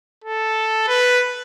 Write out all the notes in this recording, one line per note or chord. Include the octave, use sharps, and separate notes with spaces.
A4
B4